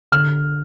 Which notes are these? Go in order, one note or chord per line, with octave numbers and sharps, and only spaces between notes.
D3 F6